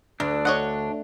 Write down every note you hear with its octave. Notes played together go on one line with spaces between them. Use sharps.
D2 D4
C#5 D#5 F#5